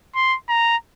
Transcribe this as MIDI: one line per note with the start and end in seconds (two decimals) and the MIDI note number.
0.15 0.36 84
0.49 0.77 82